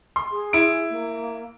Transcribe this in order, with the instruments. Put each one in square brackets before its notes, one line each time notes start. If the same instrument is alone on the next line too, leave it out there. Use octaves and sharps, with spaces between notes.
[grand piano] C6
[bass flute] G#4
[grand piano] E4 D7
[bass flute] A#3